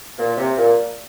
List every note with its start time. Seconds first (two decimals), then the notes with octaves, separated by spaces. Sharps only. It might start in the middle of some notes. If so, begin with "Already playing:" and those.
0.18 A#2
0.37 C3
0.57 A#2